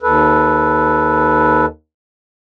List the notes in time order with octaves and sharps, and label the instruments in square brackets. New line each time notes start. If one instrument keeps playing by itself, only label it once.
[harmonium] D#2 A4 B4